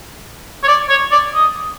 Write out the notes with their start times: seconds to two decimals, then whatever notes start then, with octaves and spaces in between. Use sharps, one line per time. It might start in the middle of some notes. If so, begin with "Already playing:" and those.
0.63 C#5
0.68 D5
0.89 C#5
1.11 D5
1.34 D#5